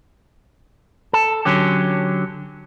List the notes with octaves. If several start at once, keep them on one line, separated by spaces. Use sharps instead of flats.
A4
D3 F#3 C#4 G4